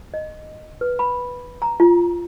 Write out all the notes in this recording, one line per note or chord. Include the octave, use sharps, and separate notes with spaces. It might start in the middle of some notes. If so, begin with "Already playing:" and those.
D#5
B4
B5
A#5
F4